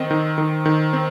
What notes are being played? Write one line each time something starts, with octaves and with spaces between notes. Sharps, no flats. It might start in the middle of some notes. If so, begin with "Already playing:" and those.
Already playing: D#3 C4 D#5
D#3
D#3
D#3
C4